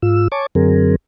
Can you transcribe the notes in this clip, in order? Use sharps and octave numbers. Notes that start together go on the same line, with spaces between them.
G#2 F4 E6
C#5 G#5 A5 C#6 D6
F#2 D3 F#3 C4 G#4 A#4